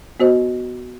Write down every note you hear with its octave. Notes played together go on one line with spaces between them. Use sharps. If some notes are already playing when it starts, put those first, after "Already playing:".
B3 F#4 C5 D#5